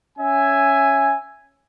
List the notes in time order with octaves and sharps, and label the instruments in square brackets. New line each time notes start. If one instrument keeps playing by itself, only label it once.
[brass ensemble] C#4 E5 G#5